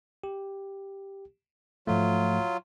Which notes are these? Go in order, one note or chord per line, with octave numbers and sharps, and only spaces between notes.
G4
G#2 F3 F#3 A3 F4